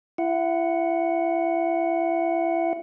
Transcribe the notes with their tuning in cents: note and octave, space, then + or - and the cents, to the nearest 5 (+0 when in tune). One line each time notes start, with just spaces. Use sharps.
E4 +30 F#5 +0